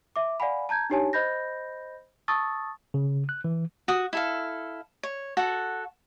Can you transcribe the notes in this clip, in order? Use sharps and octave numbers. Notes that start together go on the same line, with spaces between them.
E5 D6
D5 F5 F#5 G#5 B5
A5 A#5 G6 G#6
D4 D#4 G4 C#5 G#5 A5
C5 D#5 B5 G6 A#6
A5 C#6 D#6 E6 A6
C#3
F#6
E3
F#4 D#6
E4 A4 F5
C#5
F#4 A4 F#5